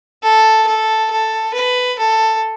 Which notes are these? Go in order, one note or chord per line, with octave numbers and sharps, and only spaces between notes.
A4
A4
A4
B4
A4